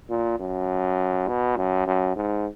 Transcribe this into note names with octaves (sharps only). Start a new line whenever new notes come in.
A#2
F#2
B2
F#2
F#2
G#2